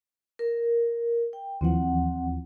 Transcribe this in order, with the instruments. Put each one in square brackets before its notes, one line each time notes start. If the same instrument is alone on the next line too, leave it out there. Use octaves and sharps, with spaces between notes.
[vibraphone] A#4
G5
[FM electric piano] D#2 E3 F3 [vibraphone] C4 F#5